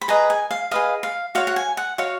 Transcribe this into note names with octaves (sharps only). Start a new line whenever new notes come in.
B5
G#4 B4 D#5 A#5
G#5
F5
G#4 B4 D#5 F5
F5
F#4 C#5 F5
F#5
G#5
F#5
F#4 C#5 F5